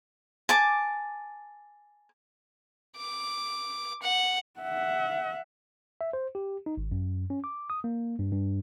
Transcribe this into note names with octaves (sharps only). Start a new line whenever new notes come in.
G#5 A5 D6
D6
F#5
E5 F#5
E5
C5
G4
D#4
G#1
F#2
C#4
D6
D#6
A#3
G2
G2